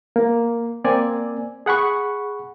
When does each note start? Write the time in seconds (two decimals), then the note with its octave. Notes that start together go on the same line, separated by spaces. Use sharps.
0.16 A#3
0.84 A#3 C4 D5 G#5
1.66 G#4 F#5 B5 C#6